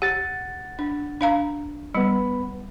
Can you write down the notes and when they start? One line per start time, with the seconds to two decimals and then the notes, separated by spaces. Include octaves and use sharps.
0.02 G4 F#5 A6
0.79 D4
1.21 D4 F5 A#5
1.94 G3 B3 B5